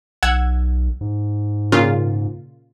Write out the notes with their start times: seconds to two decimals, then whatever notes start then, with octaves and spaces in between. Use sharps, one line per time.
0.23 B1 F#5 E6 G#6
1.01 G#2
1.72 A#2 C#3 F4